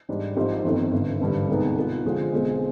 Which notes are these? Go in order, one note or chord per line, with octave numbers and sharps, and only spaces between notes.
G#2 G3 D4
G#1 G#2 F3 C4 G4
G1 F2 D#3
G#1 G2 D3
G#1 G2 D3 G3
C2 B2 G#3 B3 D#4
B2 B3 F4
F2 D3 G#3 C4 F4
B1 B2 G#3 C4